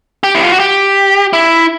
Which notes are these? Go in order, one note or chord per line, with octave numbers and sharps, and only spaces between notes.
G4
E4
F4
F#4
G4
E4